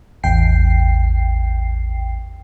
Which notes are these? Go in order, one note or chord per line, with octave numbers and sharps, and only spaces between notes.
A1 E2 G5 C7